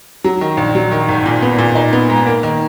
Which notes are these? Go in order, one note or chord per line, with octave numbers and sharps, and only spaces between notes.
F#3
D#3
A#1
F#3
D#3
G#1
A#2
B3
A#2
D#4
B3
G#2
A#3
D#3